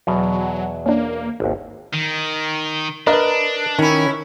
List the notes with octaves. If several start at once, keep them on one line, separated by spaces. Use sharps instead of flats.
E2 B2 F#3
A#3 C#4 D4
G#1 D#2
D#3
D4 A#4 B4 D#5
D#3 C#4 E4